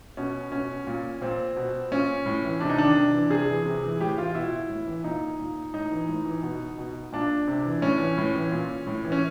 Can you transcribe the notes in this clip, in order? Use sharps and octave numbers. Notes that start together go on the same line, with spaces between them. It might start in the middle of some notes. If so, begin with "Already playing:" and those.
B2 C#4
B2 C#4
A#2
A#2 C4
B2
A#2 C#4
A2
E3
C3 D4
D#4
D#3 D4
C3
E3
C3 G#4
E3
C3
E3
A2 G4
E3 F4
B2 E4
A2
E3
A#2 D#4
A#2
A2 D#4
E3
A2
E3
B2
B2
A#2 D4
C3
E3
A2 C#4
E3
A2
E3
A#2
A2
E3
C#4